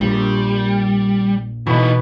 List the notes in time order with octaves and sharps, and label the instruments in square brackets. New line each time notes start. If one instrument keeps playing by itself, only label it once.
[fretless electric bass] A#1 [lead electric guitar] G3
[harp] B2 B3 [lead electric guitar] E3 D#4